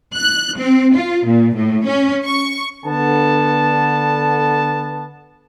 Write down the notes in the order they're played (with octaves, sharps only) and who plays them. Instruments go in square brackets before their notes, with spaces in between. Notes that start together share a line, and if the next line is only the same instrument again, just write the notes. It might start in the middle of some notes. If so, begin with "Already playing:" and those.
[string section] F#6
C4
F4
A#2
A2
C#4
C#6
[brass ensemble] D3 B3 A5